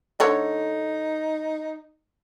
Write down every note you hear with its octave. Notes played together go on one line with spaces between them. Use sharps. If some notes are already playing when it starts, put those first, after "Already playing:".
D3 A3 D#4 C#5